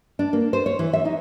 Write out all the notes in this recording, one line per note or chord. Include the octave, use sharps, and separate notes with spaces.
D4
A#3
C5
C#5
E3
E5
D#4